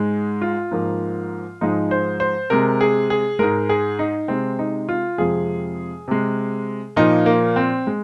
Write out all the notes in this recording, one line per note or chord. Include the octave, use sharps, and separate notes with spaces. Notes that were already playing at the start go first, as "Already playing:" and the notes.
Already playing: G#2 G#3
F4
G#2 F3 A#3
G#2 F3 G#3 D#4
C5
C5
C3 G#3 A#4
G#4
G#4
G#2 G#3 A#4
G#4
D#4
C3 G#3 C4
D#4
F4
F2 C3 F3 G#3 G#4
C3 G#3
A#2 F3 A#3 D#4
A#3
C4
G#3